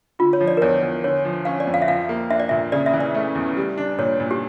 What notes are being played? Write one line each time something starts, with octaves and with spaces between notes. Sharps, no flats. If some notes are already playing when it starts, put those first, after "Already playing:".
D3 F4
C#5
F3
D5
A#4
E2 C#5
E2
D3 C#5
F3
C#4 F5
D5
F2
F5
E5
F3 F5
A#3
D4 E5
D5
A#2 E5
C#3 D5
E5
E3
D5
A3
E2
G3
D4
A#2 C#5
A#2
G4